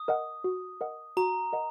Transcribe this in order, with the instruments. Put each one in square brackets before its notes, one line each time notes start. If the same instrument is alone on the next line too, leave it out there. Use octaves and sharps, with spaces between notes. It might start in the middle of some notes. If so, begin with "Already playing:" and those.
Already playing: [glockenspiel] D#6
[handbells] A#4 D#5 F#5
F#4
A#4 D#5 F#5
[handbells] F#4 [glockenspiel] A#5
[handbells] A#4 D#5 F#5